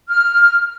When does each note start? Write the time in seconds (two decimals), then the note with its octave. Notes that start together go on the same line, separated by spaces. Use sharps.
0.09 F6